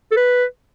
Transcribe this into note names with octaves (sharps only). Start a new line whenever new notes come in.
A4
B4